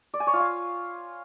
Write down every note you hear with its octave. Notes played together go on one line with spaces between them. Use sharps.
D5
G#5
C#5
F4
F5